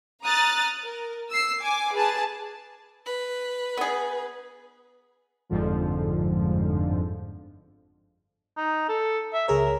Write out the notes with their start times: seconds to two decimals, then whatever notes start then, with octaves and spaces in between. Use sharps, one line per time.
0.24 A#5 D#6 F6 F#6 A6
0.82 A#4
1.31 E6 C7
1.60 G#5 D6
1.94 G#4 B4 A5
3.06 B4
3.77 B3 G#4
5.49 G1 F2 G#2 D3 F3
8.57 D#4
8.89 A4
9.33 E5
9.48 C#2 G#4 A#4 C#5